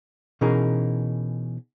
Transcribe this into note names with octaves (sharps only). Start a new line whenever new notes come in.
B2 E3 C#4 D#4 G#4 A#4